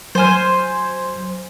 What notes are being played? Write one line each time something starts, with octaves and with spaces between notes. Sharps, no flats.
F#3 C5 G#5 F6